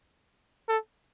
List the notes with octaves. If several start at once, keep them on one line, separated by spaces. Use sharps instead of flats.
A4